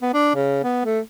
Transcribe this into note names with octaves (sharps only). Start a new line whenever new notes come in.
B3
D4
C#3
B3
A3